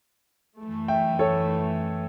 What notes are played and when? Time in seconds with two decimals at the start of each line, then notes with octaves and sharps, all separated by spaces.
0.58 F#2 E3 A3
0.88 E5 G5
1.19 A4 C#5